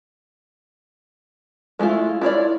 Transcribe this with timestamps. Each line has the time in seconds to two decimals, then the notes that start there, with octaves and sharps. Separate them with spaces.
1.79 G#3 A3 E4 F4
2.21 E4 F4 C#5 D5